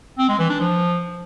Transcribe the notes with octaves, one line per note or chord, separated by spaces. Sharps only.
C4
G#3
E3
D4
F3